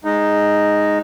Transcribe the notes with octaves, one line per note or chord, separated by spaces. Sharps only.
G#3 D#4